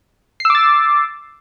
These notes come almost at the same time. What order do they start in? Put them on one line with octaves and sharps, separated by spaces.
C7 E6 D6 A6